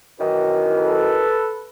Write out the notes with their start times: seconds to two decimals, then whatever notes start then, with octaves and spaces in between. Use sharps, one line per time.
0.20 F#2 D#3 E3
0.78 A4 B4